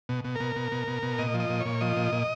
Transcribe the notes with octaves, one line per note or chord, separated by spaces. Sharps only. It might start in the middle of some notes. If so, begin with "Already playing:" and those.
B2
B2
B2 A#4
B2
B2
B2
B2
A#2 D#5
F3
D#5
A#2
C#5
A#2
F3 D#5
A#2
A#2